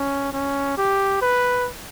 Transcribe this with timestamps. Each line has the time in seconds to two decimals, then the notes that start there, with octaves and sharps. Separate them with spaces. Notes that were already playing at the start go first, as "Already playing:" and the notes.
Already playing: C#4
0.33 C#4
0.77 G4
1.22 B4